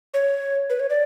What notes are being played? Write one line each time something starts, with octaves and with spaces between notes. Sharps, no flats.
C#5
B4
C#5
D5